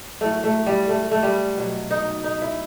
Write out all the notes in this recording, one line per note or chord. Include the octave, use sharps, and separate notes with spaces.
A2 F#3 A3
A3
G3
A3
A3
G3
B2 F#3
D#4
D#4
E4